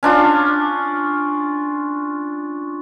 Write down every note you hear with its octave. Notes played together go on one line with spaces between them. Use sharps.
C#4 D4 F4